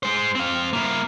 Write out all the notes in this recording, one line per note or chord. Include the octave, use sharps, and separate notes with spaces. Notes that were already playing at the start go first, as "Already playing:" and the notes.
G#3 C5
C4 F5
A#3 E4